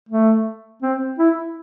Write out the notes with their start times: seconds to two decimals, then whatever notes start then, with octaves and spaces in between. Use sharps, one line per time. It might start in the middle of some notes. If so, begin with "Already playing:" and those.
0.09 A3
0.82 C4
1.19 E4